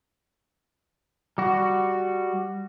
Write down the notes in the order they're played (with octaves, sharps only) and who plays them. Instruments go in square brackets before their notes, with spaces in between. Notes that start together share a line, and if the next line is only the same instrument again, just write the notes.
[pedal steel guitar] G3 F#4